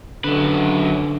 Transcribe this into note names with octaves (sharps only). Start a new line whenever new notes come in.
F#2 D3 B4